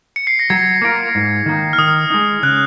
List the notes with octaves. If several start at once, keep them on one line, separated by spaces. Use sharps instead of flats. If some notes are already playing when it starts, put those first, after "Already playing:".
C#7
C7
A#6
F#3 G#6
A#3 F4 A#4
G#2
D#3 A#3 D#4
F6
D#3 D#6
G#3 D#4
C#3 F#6